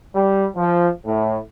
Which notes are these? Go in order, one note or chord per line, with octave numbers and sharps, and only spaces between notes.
G3
F3
A2